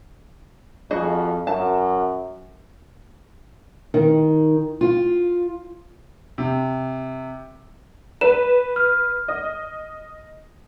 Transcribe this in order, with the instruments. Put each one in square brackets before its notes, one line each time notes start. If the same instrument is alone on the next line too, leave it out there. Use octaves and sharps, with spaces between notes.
[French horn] F2 [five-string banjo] F#4 G#4 D#5
[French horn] F#2 [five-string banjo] A5
[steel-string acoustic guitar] D#3
F4
[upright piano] C3
[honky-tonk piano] B4 [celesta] E7
[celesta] F6
[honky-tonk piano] D#5